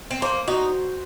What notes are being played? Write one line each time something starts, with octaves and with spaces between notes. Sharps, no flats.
C4
A#3 C5
D#4 F#4